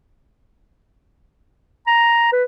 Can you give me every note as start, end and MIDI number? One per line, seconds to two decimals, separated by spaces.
1.87 2.31 82
2.32 2.44 71